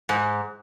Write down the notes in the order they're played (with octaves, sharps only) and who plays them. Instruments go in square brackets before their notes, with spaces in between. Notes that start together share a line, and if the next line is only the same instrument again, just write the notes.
[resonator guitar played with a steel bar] G#2